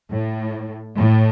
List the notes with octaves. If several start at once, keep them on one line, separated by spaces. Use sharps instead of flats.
A2
A2